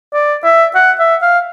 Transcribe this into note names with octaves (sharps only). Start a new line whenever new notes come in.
D5
E5
F#5
E5
F5